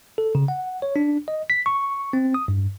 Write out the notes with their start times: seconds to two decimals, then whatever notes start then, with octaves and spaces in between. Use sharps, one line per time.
0.18 A4
0.35 C#3
0.48 F#5
0.82 C#5
0.96 D4
1.28 D#5
1.50 B6
1.66 C#6
2.13 C4
2.34 D#6
2.48 G2